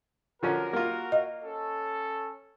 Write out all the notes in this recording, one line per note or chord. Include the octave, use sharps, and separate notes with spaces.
D3 F3 C#4 F#4 A#4
A#3 F4
D#5 F5
C#4 A4